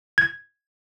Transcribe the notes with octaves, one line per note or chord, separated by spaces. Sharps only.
G#6